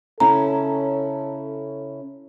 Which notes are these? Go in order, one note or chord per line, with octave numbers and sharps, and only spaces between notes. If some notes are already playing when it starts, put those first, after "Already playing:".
C#3 C#4 E4 A4 A#5